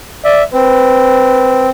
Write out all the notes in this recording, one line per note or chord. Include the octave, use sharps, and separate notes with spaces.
D5 E5
C4 B4